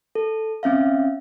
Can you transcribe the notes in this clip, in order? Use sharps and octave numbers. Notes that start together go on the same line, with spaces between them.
A4
C4 C#4 E5 F5